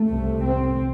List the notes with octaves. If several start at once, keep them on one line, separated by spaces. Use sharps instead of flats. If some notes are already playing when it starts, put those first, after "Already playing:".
Already playing: A3
C2 C3
C4